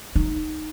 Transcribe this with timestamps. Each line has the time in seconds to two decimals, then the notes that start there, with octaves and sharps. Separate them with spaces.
0.16 D#4